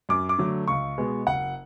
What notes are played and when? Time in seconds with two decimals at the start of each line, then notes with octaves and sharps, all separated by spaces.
0.09 F#2 D6
0.29 D6
0.38 D3 F#3 A3
0.68 C#2 C#6
0.98 B2 G#3 B3
1.27 F#1 F#5